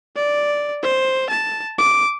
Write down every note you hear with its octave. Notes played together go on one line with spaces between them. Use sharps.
D5
C5
A5
D6